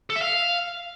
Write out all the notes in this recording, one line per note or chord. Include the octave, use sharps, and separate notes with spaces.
A4
E5
F5